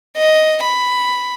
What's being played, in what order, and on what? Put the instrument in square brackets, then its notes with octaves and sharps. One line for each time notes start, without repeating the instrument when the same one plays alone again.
[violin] D#5
B5